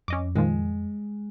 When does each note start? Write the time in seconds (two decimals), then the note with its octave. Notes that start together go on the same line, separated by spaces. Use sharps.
0.08 F2 C#4 D#5 D6
0.35 A#2 D#3 F3 G#3